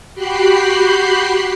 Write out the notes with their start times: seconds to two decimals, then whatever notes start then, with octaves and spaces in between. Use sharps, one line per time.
0.14 F#4 G4 G5 B5 F#6 C7